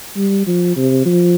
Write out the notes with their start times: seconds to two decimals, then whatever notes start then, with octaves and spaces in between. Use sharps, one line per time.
0.17 G3
0.46 F3
0.76 C3
1.06 F3